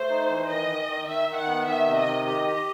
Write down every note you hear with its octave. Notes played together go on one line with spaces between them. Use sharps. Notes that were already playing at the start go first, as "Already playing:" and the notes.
Already playing: A3 C5
D#4
E3
D#3 D#5
D#3
D#3
D#3 E5
D#3
F#5
B3
D#3 E5
C3
D#5
D#3
G4 D#5
G4